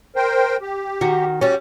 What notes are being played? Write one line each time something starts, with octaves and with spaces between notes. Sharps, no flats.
A#4 C5 G5
G4
D#3 F#4
G3 C#4 F#4